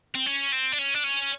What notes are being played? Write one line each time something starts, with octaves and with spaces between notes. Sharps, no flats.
C4
C#4
C4
D4
C#4
D4
C#4